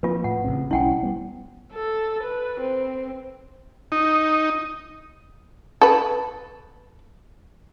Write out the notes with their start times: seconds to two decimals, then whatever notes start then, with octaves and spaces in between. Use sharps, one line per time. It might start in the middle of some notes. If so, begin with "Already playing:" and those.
0.03 F3 A#3 F4 B4
0.24 A2 F#5
0.44 A1 C#3 C4
0.71 B1 G3 C#4 E4 F#5 G5
1.03 G3 B3
1.74 A4
2.24 B4
2.61 C4
3.92 D#4
5.81 A4 B4